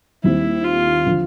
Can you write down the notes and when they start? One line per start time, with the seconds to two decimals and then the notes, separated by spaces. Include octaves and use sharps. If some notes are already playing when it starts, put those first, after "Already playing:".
0.23 D#2 D#3 G3 C4 E4
0.64 F4
1.06 D3 F3